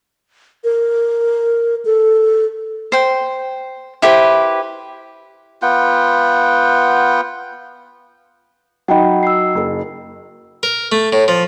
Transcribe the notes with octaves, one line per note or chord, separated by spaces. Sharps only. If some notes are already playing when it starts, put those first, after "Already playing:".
A#4
A4
C5 G5
E4 G4 B4 C5
B3 F4 F#5 G5
F#3 D#4 F#5 G5 B5
E6 C7
F#1
A#4
A3
A2
F3